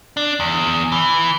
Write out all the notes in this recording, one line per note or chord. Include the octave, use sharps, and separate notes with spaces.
D4
E2
E3